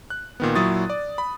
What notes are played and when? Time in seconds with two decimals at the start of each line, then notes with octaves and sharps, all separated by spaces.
0.10 F#6
0.40 A#2 D#3 B3
0.55 A#2 F#3 E4 C#6 D#6 A6
0.90 D5
1.18 B5